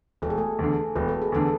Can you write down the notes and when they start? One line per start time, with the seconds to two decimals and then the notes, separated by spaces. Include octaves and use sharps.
0.22 E1 A4
0.30 G#4
0.38 A3 A4
0.59 E2 D3
0.96 E1 B4
1.08 A4
1.22 G#4
1.32 E2 D3 A3 A4